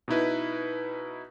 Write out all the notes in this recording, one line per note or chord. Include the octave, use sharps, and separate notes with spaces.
B2 D#4 E4 B4